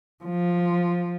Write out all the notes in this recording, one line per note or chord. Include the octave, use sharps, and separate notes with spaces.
F3